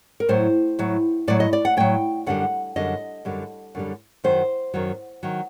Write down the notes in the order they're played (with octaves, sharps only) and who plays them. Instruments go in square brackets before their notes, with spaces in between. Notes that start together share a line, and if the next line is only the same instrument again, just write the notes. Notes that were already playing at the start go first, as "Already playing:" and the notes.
[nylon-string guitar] A#4
A2 F#3 C5
A2 F#3
A2 F#3 D5
D#5
D5
F#5
A2 F#3 G5
F#2 D3 G3 F#5
F#2 D3 G3 D#5
F#2 D3 G3
F#2 D3 G3
F#2 D#3 F#3 C5
F#2 D#3 F#3
D#3 F#3